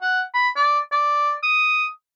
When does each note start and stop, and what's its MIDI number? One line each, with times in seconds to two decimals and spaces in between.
0.02 0.22 78
0.34 0.49 83
0.56 0.79 74
0.92 1.33 74
1.43 1.86 87